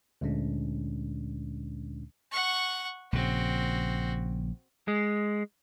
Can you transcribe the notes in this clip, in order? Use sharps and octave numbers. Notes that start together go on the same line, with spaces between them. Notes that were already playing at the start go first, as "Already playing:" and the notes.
D2 A#2 D3 G#3 C#4 D4
F#5 C#6
A#1 C#3 C4 F#4
G#3